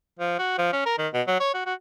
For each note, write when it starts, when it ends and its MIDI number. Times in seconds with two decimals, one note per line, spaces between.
0.19 0.34 53
0.39 0.56 66
0.58 0.71 53
0.73 0.81 61
0.86 0.97 70
0.98 1.08 51
1.13 1.22 47
1.27 1.35 54
1.40 1.53 73
1.54 1.63 66
1.66 1.74 66